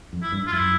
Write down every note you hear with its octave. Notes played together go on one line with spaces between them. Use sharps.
F2
E4
G2
F4
F#2 E4